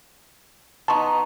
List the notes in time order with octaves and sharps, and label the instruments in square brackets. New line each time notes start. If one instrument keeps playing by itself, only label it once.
[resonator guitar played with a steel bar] B3 D#4 [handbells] A5 C6 C#6